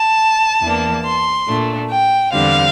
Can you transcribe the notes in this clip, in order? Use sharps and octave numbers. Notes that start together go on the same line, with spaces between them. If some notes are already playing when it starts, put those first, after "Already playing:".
Already playing: A5
E2 E3 A#3 D4
C6
A#2 A3 D4
G5
E2 D3 G3 C4 F5